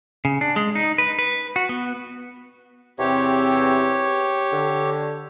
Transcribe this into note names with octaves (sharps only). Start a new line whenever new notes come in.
C#3
D4
G#3
D#4
B4
B4
F#4
B3
E2 C3 C4 G4 C#5
D3